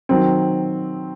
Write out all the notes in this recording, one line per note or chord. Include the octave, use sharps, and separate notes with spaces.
D#3 F#3 C4